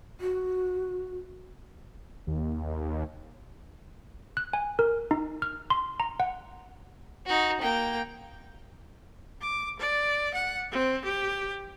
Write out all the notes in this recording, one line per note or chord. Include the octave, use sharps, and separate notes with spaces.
F#4
D#2
F#6
G#5
A#4
D#4
F6
C6
A#5
F#5
D#4 F#4
A#3 G5
D6
D5
F#5
C4
G4